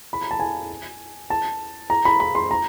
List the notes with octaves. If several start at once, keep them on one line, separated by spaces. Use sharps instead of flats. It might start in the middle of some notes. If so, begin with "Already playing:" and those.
B5
A#5
A5
G#5
A5
A#5
B5
B5
C6
A#5